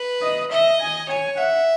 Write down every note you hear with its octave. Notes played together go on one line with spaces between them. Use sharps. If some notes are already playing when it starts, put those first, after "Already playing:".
Already playing: B4
D#5
D#5 E5
G#5
C#5 G#5
E5 F#5